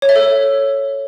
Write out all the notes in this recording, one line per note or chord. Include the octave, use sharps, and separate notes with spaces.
C#5
E5
A4